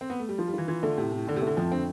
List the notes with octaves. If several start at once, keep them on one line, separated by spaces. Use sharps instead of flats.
C4
B3
A3
G3
F3 F4
G3
E3 F4
E3 F4
D3 A3
A2 C3
A2
A2 D3
C3
A3
D3
F2 F3
D3 C4